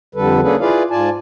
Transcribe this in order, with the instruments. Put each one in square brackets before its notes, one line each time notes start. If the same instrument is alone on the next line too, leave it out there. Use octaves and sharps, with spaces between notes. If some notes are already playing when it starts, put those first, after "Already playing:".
[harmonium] F2 D3 G3 A4 B4
A#3 C#4 D4 G#4 A4 B4
E4 F4 G#4 B4 D5 F5
G#2 F4 D5 G#5 A5